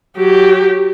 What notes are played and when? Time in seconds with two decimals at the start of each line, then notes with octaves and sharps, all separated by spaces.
0.17 F#3 G4